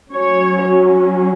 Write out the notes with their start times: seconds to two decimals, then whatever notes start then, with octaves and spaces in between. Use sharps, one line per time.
0.14 F#3 C#4 C#5